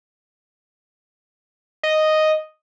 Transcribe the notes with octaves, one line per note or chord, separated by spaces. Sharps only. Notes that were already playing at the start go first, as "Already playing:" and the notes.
D#5